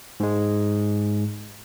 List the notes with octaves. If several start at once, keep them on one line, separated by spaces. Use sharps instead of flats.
G#2 G#3